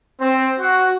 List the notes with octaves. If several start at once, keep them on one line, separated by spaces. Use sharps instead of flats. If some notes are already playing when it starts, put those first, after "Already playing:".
C4
F#4